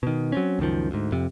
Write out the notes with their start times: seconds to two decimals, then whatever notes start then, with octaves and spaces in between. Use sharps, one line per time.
0.03 B2 D#3
0.32 F#3 C4 C#4
0.59 C#2 F#2 D#3 F3
0.91 D2 G#2
1.12 F2 C3